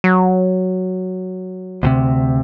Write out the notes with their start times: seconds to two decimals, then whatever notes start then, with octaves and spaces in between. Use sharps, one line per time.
0.04 F#3
1.83 D2 A2 C3